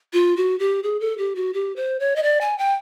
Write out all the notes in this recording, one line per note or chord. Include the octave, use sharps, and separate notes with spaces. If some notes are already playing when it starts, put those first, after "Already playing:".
F4
F#4
G4
G#4
A4
G4
F#4
G4
C5
C#5
D#5
D5
G#5
G5